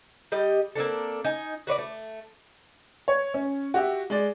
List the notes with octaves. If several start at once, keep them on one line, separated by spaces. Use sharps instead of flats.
G3 G4 D#5
A#3 C4 D4 A4
D#4 G#5
F#4 B4 C#5 D5
A3
C#5
C#4
F#4 G4 E5
G#3 D5